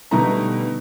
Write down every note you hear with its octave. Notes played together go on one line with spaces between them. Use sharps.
B2 D3 G3 A3 D#4 A#5